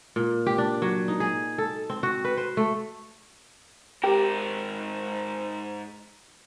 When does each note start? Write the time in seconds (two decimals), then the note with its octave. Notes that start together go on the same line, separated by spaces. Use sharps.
0.16 A#2
0.47 G4
0.58 D4
0.82 F#3
1.08 D#4
1.20 G#4
1.58 A4
1.90 C4
2.03 F#4
2.25 B4
2.37 C5
2.57 A3
4.04 G#2 G4 A#4